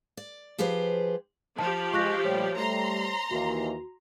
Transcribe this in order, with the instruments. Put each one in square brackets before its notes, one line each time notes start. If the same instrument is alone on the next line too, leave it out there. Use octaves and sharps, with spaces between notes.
[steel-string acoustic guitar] D5
F3 G4 G#4 B4 C5
[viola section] F3 G4 [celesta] A5
[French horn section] G#3 F4 [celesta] C#6 F#6 A#6
[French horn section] A#2 G3 A3 [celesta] C5 C#5
[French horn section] G3 A3 [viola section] A#5 C6
[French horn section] D#2 E3 A#3 [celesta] F#4